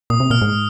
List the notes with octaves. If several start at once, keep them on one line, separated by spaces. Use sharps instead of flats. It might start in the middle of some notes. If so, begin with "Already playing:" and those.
A#2 D#6
C3
A#2 F6
G#2